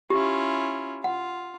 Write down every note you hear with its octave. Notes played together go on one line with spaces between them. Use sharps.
C#4 E4 F4 G4
F4 F#5